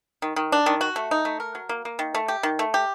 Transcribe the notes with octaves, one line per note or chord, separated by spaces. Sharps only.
D#3
D#3
D4
D#3
F#4
A3
D#4
A3
A#4
F#3
A#3
A#3
D#3
A3
G4
D#3
A3
G4